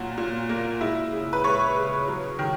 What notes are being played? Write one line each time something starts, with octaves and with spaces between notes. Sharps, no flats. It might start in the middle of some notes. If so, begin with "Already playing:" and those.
Already playing: A#2 F#3 F#4
A#2
A#3
G#3 E4
C#3
B4
G#3 C#5
C#3
F#3
D#3